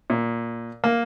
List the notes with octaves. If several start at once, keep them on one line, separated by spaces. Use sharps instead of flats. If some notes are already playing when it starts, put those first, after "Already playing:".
A#2
A#3